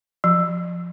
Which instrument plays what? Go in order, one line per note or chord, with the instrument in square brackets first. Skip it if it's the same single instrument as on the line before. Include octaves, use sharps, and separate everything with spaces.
[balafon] F3